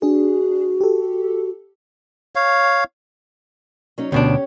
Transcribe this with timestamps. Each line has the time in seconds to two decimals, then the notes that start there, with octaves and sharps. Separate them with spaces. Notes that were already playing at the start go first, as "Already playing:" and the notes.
0.02 D4 F#4 G#4
0.81 G4 A4
2.35 C#5 F5
3.98 F#3 C#4 D#4
4.12 D2 B2 C#4 D4 G4 C#5